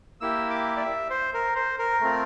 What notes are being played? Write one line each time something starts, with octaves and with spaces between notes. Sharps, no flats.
A#3 E4 G4 E6
D6
D5
E5
C5
A#4
C5
A#4
A3 C4 F4